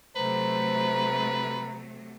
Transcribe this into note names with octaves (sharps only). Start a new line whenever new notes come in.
C3 F#3 A3 B4 C5 A#5